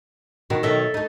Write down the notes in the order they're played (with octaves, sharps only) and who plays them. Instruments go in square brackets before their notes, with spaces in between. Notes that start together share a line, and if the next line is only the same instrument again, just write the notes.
[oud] B2 F#4 [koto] D#3
[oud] B2 D#3 F#3 [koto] A4 E5
[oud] A3 D#4